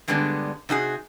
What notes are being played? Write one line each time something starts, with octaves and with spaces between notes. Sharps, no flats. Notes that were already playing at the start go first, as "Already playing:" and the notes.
G2 D3 G3 G#3 B3 D4
C3 D#4 F#4 G#4